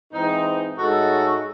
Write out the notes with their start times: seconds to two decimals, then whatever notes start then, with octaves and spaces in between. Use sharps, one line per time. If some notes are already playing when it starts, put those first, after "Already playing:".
0.11 G#2 E3 C4 D#4
0.76 A2 G#3 D#4 F#4 A4